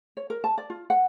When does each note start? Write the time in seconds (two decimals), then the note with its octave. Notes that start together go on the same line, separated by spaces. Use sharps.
0.17 C#5
0.30 A#4
0.44 A5
0.58 D5
0.70 F4
0.90 F#5